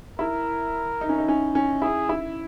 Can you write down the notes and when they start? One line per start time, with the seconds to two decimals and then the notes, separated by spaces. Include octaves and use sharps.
0.19 E4 A#4
1.01 D#4
1.09 C#4
1.18 D#4
1.28 C#4
1.55 C#4
1.82 E4 G#4
2.09 E4